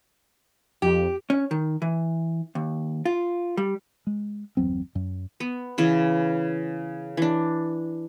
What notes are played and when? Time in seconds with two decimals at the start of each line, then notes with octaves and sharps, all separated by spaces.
0.82 F2 G4
1.30 C#4
1.51 D#3
1.82 E3
2.55 D#2
3.05 F4
3.57 G3
4.07 G#3
4.57 G1 E2 F#3 C4
4.95 F#2
5.40 B3
5.78 C#3 E3
7.17 E3 D4